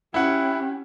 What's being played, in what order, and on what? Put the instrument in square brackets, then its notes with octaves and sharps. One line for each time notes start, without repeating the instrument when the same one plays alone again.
[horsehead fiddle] C#4 G4 [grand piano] E4 F#5